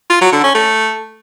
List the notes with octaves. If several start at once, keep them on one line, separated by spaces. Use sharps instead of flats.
F4
F#3
D3
C#4
A3